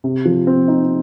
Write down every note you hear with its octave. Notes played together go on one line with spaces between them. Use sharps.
C3
F3
C4
D#4